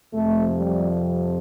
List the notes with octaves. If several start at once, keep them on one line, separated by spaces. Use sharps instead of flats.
F2 C3 F3 A3
G3